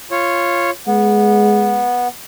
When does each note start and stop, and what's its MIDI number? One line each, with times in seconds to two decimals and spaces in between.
0.11 0.70 65
0.11 0.70 73
0.87 1.85 56
0.87 2.08 59